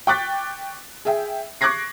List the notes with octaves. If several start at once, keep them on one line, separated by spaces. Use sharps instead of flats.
G5 C#6 D6 F#6 A6 B6
G#4 E5 G5
C#6 D6 F#6 G#6 A#6 C7